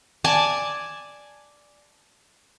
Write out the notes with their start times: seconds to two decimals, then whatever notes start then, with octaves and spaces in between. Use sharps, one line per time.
0.24 D5 G#5 A5